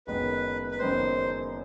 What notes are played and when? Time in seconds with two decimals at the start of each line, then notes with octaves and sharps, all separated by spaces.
0.07 F#1 F#2 D#3 G#3 B3 B4
0.71 B4
0.79 F#1 F#2 D#3 G#3 B3 C5